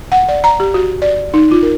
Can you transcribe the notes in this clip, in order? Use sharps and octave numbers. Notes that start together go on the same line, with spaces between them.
F#5
D5
A#5
G4
F#4
D5
D#4
F4
A#4